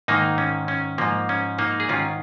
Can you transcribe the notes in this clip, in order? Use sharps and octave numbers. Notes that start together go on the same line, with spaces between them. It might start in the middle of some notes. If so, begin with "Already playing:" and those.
G#2 D#3 A#3 D#4
C#4
C#4
G#2 F3 A#3
C#4
A#3 D#4
G#4
G#2 D#3 C#4 F4